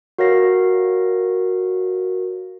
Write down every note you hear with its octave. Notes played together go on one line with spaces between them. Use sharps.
F#4 A#4 C#5 F5 A#6 C7